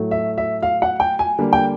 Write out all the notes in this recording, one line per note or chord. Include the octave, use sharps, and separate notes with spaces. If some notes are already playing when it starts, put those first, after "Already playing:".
Already playing: A2 F#3 A3
E5
E5
F5
F#5
G5
G#5
D3 G3 A#3
G5